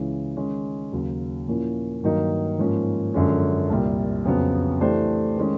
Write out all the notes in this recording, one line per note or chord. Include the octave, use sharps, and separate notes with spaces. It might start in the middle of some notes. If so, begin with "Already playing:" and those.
Already playing: C#2 C#3 E3 G#3 C#4
D#3 G#3 C#4
D#2 C#3 F#3
A#2 F3 A#3 C#4 E4
G2 D#3 F#3 A#3 D#4
G#2 F3 A#3 C#4
F#2 D3 F3 G#3 C#4
C2 A#2 G3
F2 C#3 F#3 B3
E3 A3 D4 G4 C5
D#3 G#3 C#4